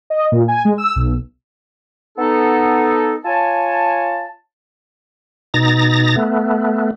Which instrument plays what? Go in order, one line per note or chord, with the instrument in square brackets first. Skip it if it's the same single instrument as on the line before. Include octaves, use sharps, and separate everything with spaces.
[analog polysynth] D#5
A#2
G#5
G#3
E6
B1
[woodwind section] B3 D#4 A4
F4 C#5 G#5 A5
[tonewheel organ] B2 D#4 A#5 A6 A#6
A3 B3